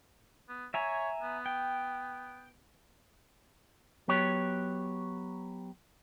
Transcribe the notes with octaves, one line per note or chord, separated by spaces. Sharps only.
B3
C#5 E5 G#5 A#5
B3
G5
F#3 B3 G4 C#5